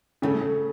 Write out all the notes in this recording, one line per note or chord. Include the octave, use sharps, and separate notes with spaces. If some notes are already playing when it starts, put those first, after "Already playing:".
C#3 A3